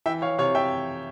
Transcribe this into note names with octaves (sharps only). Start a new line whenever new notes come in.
E3 E5 G5
C#5 F5
C3 C#5 F5
E5 G5